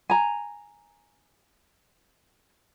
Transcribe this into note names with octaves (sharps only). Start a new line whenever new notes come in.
G#5 A#5